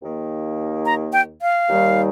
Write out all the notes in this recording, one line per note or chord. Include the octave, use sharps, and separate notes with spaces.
D#2 D#3 A#3
A#5
G5
F5
D#2 D#3 G3